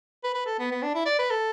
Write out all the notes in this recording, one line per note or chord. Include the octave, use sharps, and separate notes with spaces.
B4
B4
A4
B3
B3
D4
E4
D5
B4
A4